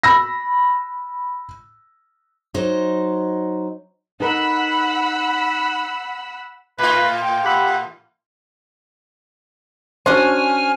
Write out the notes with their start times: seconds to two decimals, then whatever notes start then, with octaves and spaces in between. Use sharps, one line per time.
0.03 B5 E6 A#6
2.54 F#3 D#4 C5
4.20 D#4 A#4 F#5 B5 E6
6.78 A2 F4 B4
7.22 G5
7.45 G4 F#5 B5 E6
10.06 C#4 D4 F#4 C5 G#5 F6